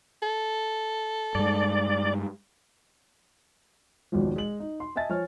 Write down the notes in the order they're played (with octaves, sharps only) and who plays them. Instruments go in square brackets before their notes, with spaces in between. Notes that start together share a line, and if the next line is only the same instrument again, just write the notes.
[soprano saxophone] A4
[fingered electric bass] G2 G#3 [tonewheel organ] D5
[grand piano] G#1 D#2 B2 F3
G#3 F#7
D#4
C6
D#5 E5 G#5 A5 A6
F3 C#5 G#5 F6